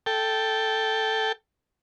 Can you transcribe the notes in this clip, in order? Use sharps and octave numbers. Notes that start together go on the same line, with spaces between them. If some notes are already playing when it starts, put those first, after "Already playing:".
A4 G5